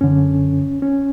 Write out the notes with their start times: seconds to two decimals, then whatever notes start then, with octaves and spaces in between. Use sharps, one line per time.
0.01 F#2 D3 C#4
0.82 C#4